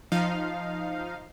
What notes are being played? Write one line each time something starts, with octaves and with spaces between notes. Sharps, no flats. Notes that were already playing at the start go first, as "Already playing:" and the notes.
F3 D#4 F5